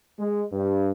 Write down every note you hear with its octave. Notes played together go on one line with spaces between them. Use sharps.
G#3
G2